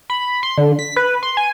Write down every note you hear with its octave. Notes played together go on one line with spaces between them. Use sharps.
B5
C6
D3
B6
B4
C6
G#5